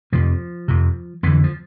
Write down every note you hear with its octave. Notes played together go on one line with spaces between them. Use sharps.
F2 C3 F3
F2 C3
F2 D3 E3
F3